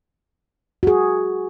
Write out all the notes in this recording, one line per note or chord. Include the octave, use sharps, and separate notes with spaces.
F#4 G#4